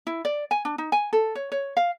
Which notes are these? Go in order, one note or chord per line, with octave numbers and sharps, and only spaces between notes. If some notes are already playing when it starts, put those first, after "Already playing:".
E4
D5
G#5
D4
D#4
G#5
A4
C#5
C#5
F5